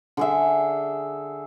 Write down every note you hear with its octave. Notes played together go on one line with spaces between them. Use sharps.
D3 G#4 E5